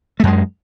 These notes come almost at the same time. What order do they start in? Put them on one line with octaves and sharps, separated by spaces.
A3 F#2 G#3